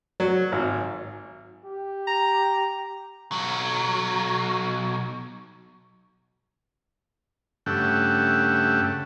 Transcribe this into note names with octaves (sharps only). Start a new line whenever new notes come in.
F#3
G#1
G4
A#5
B1 F#3
G2 C#3 A3 E5 F#5 G5